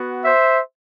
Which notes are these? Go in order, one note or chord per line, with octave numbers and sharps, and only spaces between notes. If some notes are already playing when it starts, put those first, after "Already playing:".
Already playing: B3 F#4
C5 E5